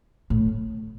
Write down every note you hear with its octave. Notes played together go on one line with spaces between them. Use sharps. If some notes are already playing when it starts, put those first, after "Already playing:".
A2